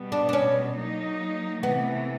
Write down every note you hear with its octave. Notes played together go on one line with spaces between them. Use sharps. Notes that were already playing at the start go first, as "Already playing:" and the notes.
Already playing: B2 G3 B3
D4
D4
C#4
F#3 A#3 D#4
C3 E3 A3 B3